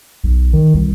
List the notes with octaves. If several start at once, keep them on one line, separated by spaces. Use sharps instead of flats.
B1
D#3
C2